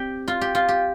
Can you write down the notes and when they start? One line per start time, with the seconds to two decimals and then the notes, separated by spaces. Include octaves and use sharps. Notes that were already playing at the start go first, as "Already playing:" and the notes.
Already playing: C4 G4
0.28 F4
0.41 G4
0.55 F4
0.69 G4